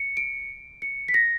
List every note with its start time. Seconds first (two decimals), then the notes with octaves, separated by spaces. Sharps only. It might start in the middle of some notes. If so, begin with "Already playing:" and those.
Already playing: C#7
0.17 D7
0.82 C#7
1.08 B6
1.14 A#6